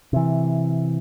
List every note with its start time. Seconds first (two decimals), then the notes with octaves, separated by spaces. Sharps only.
0.13 C3 E3